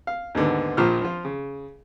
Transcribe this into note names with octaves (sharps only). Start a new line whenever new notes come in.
F5
D#2 G#2 D3 B3
A#1 A#2 F3 F4 C#6 F6
F3 F4
C#3